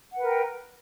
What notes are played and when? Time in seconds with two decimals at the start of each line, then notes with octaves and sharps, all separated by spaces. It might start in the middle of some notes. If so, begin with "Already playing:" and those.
0.12 F#5
0.17 B4
0.21 A#4
0.26 G5